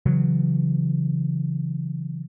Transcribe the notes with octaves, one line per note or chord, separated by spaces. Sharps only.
C#3 E3 F#3